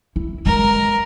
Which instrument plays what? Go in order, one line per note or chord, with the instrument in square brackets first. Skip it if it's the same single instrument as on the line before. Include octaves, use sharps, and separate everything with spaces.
[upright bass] E4
[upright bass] G#3 A#3 [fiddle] A#4